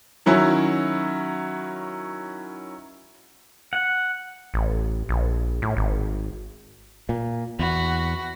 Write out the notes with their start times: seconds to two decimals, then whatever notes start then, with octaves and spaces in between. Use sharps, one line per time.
0.26 D#3 F#3 C#4 E4
3.73 F#5
4.54 A1
5.09 A#1
5.62 A2
5.77 G#1
7.09 A#2
7.59 E2 F#4 B5